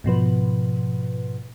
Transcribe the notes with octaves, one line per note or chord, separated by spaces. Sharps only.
G#2 B2 F3 B4